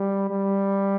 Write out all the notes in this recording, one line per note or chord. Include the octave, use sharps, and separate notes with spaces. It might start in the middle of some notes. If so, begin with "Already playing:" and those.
Already playing: G3
G3